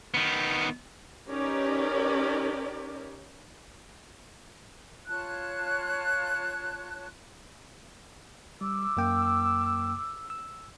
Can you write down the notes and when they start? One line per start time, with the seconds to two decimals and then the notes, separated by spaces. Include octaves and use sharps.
0.14 D#3 B3
1.29 C#4 D#4 G4 A#4 B4 D5
5.07 F4 C#5 A5 F#6
8.61 G3 D6 E6
8.97 F#2 A#3 G5
10.30 E6